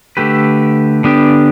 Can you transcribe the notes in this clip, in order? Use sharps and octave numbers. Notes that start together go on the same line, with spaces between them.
D3 A3 G4 B4
D3 B3 D4 G4